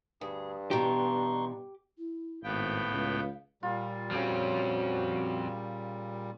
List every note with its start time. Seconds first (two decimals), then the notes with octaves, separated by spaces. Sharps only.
0.21 D2 G2 G#4
0.71 B2 E3 D#4 G4 C6 C#6
1.98 E4
2.43 G#1 A2 B3 F5 G5
2.92 C#2
3.63 A#2 G3 F4
4.11 C#3 F3 C4 F#4 G4 G#5